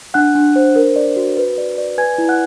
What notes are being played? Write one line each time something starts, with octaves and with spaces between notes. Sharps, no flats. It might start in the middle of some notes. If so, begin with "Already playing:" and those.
D4 F#5 F#6
D4
C5
A#4
D5
F#4
B4
D5
D5
B4 G#5 G#6
E4
F#5 F#6